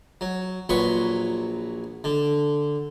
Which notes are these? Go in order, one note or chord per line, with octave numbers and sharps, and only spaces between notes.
F#3
A#1 F#3 B4 C6 C#6
D3